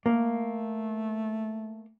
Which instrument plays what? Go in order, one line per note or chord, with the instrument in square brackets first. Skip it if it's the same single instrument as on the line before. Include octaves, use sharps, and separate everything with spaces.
[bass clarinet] A3 [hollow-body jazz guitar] A#3